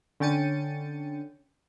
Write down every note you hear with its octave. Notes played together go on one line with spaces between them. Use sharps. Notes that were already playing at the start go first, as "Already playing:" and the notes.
D3 C#4 G5 A6 C#7 D#7